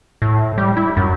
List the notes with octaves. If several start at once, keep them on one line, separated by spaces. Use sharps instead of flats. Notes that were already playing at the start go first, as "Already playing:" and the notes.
A2
G3
E4
F#2